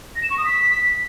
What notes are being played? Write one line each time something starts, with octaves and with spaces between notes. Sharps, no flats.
A#6
E7
C#6
D#6
B6